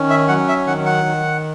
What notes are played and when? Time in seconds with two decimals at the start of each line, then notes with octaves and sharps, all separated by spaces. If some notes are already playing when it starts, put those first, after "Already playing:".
Already playing: D#3 C#4
0.10 E5
0.28 F#3 F#5
0.48 E5
0.67 D#3 F#5
0.86 F#5
1.05 D#3